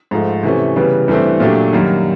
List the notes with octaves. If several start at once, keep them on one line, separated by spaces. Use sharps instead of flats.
G#2 F3 A3
C3 E3 A3 C#4
C#3 E3 G3 B3
G2 E3 A3 C4 E4
A#2 F#3 A3 D4 G4
F#2 D#3 G3 A#3